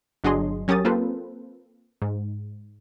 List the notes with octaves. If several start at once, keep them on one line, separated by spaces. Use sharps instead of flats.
G1 F#3 D4 G#4 D#5 C6
F#3 C#4 G4 A#4 D#6 A6
A#3 C4 F4 A4 B4 C5
G#2